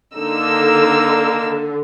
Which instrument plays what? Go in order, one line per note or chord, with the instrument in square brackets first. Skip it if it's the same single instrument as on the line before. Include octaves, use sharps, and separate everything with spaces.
[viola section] D3 [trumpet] A#3 [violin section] D#4 E6